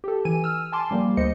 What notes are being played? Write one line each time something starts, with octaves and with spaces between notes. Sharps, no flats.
G4 A4
E3 G#5 D#7
E6 F6
G#5 A5 C6 D6
F3 G3 A#3
D2 C5 D#5 C#7